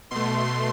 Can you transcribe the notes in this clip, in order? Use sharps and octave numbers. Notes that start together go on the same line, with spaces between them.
B2 A3 C6